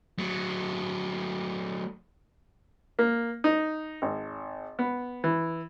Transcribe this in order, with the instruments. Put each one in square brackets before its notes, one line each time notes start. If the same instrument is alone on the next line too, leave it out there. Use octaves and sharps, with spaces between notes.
[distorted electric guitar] F#3 A3
[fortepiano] A#3
D#4
G#1
B3
E3